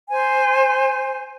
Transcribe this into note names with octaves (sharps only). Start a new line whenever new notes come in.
C5 G#5